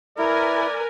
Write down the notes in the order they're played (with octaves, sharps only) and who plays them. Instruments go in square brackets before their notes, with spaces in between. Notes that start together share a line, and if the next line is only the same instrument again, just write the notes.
[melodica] E4 [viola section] A#4 B4 G#5 [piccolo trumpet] D5